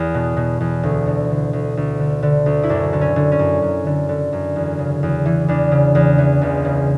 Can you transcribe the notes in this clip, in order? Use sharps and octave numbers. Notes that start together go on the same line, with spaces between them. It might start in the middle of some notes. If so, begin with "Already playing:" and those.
Already playing: E2 E4
B2
B2
E2
D2
D3
D3
D2
D2
D3
D3
D2
E4
F#2 D4
D3
C#4
D3
C#4
F#2
F#2
D3
D3
F#2
E2
C#3
E2
E3
E2 D4
C#3
E2
E3
C#2
C#3